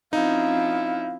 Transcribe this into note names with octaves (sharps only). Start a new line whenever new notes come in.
F3 C4 C#4 D#4 E4 F5